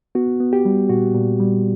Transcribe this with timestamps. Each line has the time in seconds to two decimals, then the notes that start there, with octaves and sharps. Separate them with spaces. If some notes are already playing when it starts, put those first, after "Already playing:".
0.15 B3 F#4
0.40 B3
0.53 G4
0.65 G3
0.89 A#2 F#4
1.14 A#2
1.40 G3